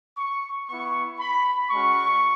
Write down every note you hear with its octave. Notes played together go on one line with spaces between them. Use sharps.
C#6
B3 E4 C#6
B5
G#3 C#4 F#4 C#6